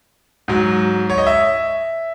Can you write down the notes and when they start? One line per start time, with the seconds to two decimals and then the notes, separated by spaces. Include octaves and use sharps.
0.48 G#2 F#3
1.10 C#5
1.18 D#5
1.27 E5